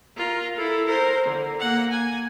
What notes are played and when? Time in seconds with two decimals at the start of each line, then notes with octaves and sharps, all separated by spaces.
0.17 F4 A#4
0.56 E4 A4
0.86 A#4 C5
1.26 D3
1.60 A#3 F#5
1.91 G#5